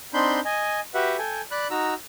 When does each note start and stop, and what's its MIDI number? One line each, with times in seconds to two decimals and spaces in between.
0.14 0.40 60
0.14 0.40 62
0.14 0.40 63
0.14 0.40 83
0.14 0.40 84
0.14 0.40 91
0.45 0.80 75
0.45 0.80 80
0.94 1.17 66
0.94 1.17 67
0.94 1.17 71
0.94 1.17 76
0.94 1.17 78
1.18 1.41 69
1.18 1.41 79
1.18 1.41 80
1.51 1.67 74
1.51 1.67 83
1.51 1.67 90
1.70 1.94 63
1.70 1.94 66
1.70 1.94 82
1.70 1.94 88